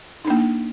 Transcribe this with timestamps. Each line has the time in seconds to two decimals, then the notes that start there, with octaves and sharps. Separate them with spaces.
0.25 D#4
0.27 D4
0.30 A#3